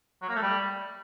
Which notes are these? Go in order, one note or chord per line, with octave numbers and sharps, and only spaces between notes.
F#3
A#3
A3
G3